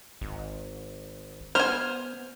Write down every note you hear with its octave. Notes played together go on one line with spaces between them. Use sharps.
G#1
B3 C5 G#5 F6